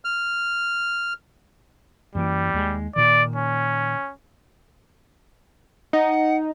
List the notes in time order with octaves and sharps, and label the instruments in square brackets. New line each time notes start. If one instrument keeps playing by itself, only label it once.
[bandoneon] F6
[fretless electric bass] F#2 E3 A#3 [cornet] G3
[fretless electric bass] D#2 G#3
[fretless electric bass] A#2 D#3 [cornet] D5
[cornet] C#4
[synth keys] D#4 [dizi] F#5